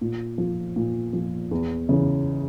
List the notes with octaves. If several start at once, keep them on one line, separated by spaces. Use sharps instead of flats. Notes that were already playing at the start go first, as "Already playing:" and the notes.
A#2
F3
A#2
F3
E2
C#3 E3